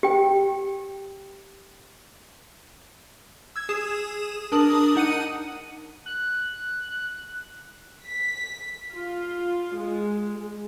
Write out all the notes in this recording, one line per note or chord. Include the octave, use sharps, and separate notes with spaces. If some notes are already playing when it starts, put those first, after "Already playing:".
G4 G5
E6 G#6
G#4 D#6 E7
D4 A#4 A5 D#6 F#7
D#4 F#5 C#7 D#7
F#6
B6
F4
G#3